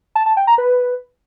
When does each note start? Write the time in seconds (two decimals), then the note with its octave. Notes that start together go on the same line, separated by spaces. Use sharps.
0.15 A5
0.26 A5
0.37 G5
0.47 A#5
0.58 B4